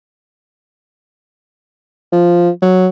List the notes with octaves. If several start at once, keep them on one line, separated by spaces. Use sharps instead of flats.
F3
F#3